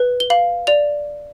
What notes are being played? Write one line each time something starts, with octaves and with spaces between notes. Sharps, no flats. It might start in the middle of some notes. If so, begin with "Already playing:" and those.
Already playing: B4
G7
F5 F#7
D5 F7